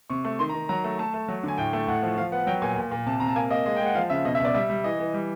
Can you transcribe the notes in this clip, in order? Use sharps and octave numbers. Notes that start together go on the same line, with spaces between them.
C3 C#6
A3
D#3 C6
A#5
D#3
F#3 A#5
A3
A3 A5
A3
F#3
D3 G#5
A2 G5
A3
A2 F#5
F3
F3 F5
B3 F#5
F#3 G5
A#2 G#5
A#2
A#2
C3 A5
C3 A#5
A5
A#3 G#5
A#3 D#5
G#3 D#5
G#3 G5
F#5
F3 F5
C#3 E5
B2 D#5
E5
B2 D5
G3 E5
G3
E3 D#5
E3
G3